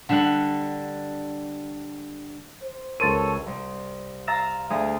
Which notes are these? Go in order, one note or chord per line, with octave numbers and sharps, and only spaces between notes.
D3 G3 F#5
C5
C#2 A4 A#4 C#5 C6 A6 D#7
C2
F5 A#5 E6 A6 A#6 E7
D2 G#4 F5 D#6